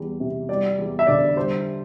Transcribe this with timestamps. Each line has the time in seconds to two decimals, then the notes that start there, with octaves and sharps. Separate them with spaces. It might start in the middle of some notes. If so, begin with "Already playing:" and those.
Already playing: E2 G3
0.20 C3
0.49 G3 D5
0.78 E2
0.99 E5
1.07 D3 D5
1.36 G3 C5